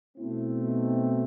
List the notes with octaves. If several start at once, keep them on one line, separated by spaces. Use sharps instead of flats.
B2 A3 C4 E4
D#4